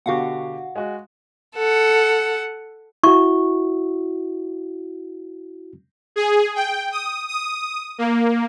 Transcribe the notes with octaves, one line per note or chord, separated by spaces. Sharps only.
B2 D3 F#4 G4 F5 F#5
G#3 F#4
A4 F#5
E4 F#4 C#6
G#4
G5
D#6
D#6
A#3